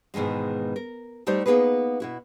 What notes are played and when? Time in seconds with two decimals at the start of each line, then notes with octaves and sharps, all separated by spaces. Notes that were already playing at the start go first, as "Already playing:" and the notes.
0.14 G#2 B2 D#3 E3 G#3
0.76 A#4
1.27 G3 A3 D#4 G4 C5
1.46 A#3 B3 D#4 G#4 B4
2.00 B2 E4 F#4